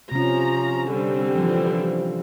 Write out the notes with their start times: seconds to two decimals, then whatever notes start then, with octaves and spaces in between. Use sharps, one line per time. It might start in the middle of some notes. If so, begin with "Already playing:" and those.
0.12 C3 F3 C#4 A#5
0.90 D3 G3 C4
1.35 E3 F3